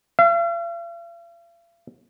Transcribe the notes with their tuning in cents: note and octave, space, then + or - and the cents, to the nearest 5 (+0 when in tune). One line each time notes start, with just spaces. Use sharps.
F5 -45